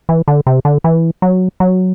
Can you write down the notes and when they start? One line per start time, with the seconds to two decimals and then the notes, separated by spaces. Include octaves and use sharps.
0.09 E3
0.28 D3
0.47 C3
0.65 D3
0.84 E3
1.22 F#3
1.60 F#3